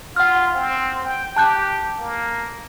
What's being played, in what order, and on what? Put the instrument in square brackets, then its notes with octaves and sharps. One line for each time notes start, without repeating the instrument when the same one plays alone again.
[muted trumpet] F4 [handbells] F#5 F6
[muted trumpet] C4
G5
[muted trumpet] G4 [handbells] A5 F#6 G6
[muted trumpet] A#3